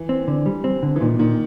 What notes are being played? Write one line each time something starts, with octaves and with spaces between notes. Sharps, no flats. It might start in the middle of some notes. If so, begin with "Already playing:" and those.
Already playing: E3
C4
D3
G3
C4
D3
E3
A#2 D#3
A#2 D#3